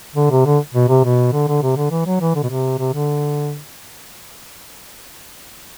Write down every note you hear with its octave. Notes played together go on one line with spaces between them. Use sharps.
D3
C3
D3
B2
C3
B2
D3
D3
C3
D3
E3
F#3
E3
D3
B2
C3
C3
D3